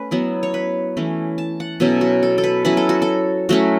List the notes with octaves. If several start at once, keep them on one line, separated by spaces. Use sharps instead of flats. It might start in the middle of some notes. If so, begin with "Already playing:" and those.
Already playing: A3 C#4 B4
F#3 B3 E4
C#5
B4
E3 A3 C#4
A5
F#5
B2 F#3 C#4 E4 A4
F#4
A4
A4
B4
F#3 C#4 E4 B4
A4
F#4
A4
F#3 A3 C#4 E4 F#4